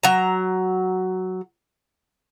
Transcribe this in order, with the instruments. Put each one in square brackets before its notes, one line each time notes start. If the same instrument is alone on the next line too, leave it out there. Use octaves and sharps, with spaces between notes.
[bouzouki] F#3 A#5